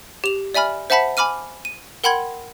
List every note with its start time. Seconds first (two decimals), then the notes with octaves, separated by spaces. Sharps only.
0.24 G4 F7
0.54 D5 E5 G#5 B5 F6
0.90 C5 E5 F#5 A5 B5 B6
1.17 G#5 B5 D6 F6 D#7
1.65 D#7
2.04 A#4 F#5 G5 B5 C6 G#6